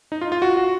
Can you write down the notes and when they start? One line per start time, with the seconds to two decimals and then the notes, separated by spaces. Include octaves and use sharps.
0.12 D#4
0.21 F4
0.32 F4
0.42 F#4
0.57 F#4